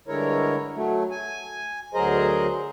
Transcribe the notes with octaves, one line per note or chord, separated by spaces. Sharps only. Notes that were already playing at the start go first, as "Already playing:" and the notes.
G2 D3 G#3 E4 A#4 C#5
F#3 A3
G#5
D2 F#3 G#4 A#4 C5 D#5